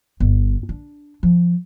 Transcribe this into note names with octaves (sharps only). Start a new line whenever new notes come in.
G1
D4
F3